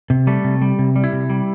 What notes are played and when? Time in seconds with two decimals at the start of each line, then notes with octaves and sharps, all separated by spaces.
0.10 C3
0.27 G3 A3
0.44 C3
0.62 G3
0.79 C3
0.96 G3
1.04 E4
1.13 C3
1.30 G3